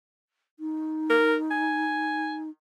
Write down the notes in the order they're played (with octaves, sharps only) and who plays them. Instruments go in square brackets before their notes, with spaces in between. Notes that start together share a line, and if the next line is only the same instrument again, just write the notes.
[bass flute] D#4
[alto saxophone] A#4
G#5